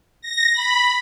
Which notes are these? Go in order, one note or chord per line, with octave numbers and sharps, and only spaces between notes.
A#6
B5